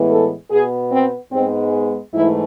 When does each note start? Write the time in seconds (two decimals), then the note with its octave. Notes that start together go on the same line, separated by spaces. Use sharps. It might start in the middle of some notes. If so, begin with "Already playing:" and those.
Already playing: A2 E3 G#3 B3
0.09 A4
0.50 B2 B3 G#4
0.91 C4
1.31 G#2 G#3 B3 C4
2.13 G#2 E3 A3 E4